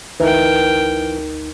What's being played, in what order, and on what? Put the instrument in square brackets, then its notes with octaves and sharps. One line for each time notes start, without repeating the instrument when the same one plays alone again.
[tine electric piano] G#1 D2 D#4 [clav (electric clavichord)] E3 [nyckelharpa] A#4 G5